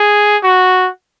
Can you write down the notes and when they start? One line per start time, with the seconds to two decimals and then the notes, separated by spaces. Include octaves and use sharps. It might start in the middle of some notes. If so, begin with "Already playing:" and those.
Already playing: G#4
0.43 F#4